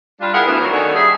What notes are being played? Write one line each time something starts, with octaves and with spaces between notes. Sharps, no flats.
G3 D4 F4
B3 E4 G#4 A#4 F5 F#5
D2 E3 B3
D#3 F#3 A#4
D#3 C#4 D4 F#4 A4 C#5
G3 G#4 E5